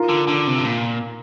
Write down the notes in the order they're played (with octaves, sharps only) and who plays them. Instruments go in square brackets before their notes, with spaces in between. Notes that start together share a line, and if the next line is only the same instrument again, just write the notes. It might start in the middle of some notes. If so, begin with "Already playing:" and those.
Already playing: [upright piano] F4 A#4
[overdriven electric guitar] D3
D3
C3
G2
A#2